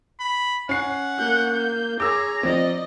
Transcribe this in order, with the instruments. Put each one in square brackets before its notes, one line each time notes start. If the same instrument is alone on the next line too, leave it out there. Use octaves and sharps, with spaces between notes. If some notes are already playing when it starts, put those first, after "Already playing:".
[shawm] B5
[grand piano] C#4 C7 [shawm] F#5
[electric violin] A#3 G6
[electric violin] G#4 C#5 [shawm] A#5 [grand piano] D6 E6
[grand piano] F3 C4 [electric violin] D5 D#5